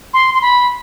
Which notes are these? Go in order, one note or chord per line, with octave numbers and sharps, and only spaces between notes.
C6
C6
B5